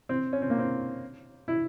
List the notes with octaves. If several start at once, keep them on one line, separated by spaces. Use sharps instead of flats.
C4
C#4
C4
A#3
C4
E4